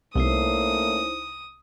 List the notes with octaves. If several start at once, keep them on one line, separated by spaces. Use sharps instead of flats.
C2 A3 A#3 C#4 D#4 E4 C5 D#6